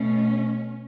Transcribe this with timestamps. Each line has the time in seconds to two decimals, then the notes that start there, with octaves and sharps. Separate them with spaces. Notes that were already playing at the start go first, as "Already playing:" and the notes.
Already playing: B2 A3 C#4